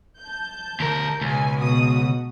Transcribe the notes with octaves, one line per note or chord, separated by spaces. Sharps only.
A5 G6
D2 A#4
C#2 B2 G#5
B2 F#4 D#6